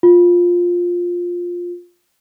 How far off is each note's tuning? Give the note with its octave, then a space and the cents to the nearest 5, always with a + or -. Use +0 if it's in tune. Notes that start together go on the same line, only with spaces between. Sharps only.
F4 +10